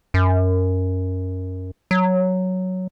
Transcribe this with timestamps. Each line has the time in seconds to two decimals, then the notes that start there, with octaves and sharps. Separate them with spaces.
0.14 F#2
1.91 F#3